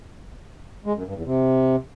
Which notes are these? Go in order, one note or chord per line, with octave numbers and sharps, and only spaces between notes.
G#3
F#2
G2
E2
C3